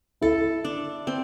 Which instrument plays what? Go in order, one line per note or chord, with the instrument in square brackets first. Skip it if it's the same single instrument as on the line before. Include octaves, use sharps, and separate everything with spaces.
[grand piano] E4 [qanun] A4
[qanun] D4
C4